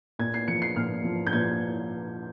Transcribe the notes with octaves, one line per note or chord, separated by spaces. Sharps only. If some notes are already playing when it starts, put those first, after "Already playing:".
A#2 G#6
C7
F3 C#7
C7
A#2 F6
F3
G6
A#2 G#6